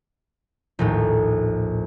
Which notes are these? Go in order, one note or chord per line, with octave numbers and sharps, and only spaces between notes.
A#1 D#2 A2